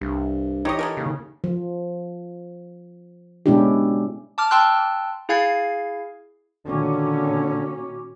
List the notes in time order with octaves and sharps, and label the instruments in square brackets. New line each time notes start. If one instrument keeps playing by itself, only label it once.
[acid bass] C2 [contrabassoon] G2
[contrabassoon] E3 [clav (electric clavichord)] D#4 G4 C#5 [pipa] E4 D#5
[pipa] E4 A4 A#4
[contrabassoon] D#2 [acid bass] C#3
[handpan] F3
B2 G#3 C#4 D4 E4 G4
[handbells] A5 D6 F6
G5 A5 C6 E6 F#6
E4 G#4 F5 G#5 G#6 C7
[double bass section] A#2 D#3 C#4 [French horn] D3 [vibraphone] F#4 C#6 D6